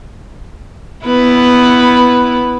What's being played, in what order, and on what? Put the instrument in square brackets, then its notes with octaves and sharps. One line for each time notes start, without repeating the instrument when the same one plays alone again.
[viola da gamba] B3 E4 B4